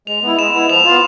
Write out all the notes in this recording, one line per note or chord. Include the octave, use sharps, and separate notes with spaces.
G#3 F7
B3 E4
G#3 E7
B3 E4
F3 F7
B3 F4